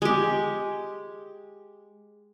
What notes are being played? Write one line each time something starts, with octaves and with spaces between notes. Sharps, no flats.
G#3 G4